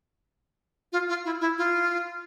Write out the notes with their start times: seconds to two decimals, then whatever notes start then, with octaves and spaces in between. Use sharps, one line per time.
0.92 F4
1.09 F4
1.25 E4
1.41 E4
1.58 F4